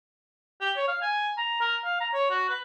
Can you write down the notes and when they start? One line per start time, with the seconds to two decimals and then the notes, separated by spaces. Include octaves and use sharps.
0.61 G4
0.77 C#5
0.88 F5
1.02 G#5
1.37 A#5
1.61 A#4
1.85 F5
2.00 A#5
2.13 C#5
2.31 F#4
2.49 B4